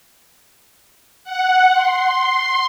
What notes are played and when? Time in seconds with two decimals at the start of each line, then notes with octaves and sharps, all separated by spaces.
1.24 F#5
1.73 C6